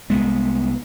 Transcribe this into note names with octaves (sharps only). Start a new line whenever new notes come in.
C2 G#3 B3